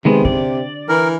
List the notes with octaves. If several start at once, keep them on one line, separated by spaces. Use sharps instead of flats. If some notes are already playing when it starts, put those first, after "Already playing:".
C3 D#3 G#3 B3
D3 D5
E3 A#4